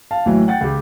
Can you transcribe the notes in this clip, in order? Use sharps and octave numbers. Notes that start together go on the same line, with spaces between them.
F5 A5
A1 A2 E3 F#3
F#5 G5 A6
C#2 G4